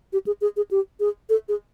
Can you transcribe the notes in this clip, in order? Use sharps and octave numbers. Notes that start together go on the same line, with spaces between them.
G4
G#4
G#4
G#4
G4
G#4
A4
G#4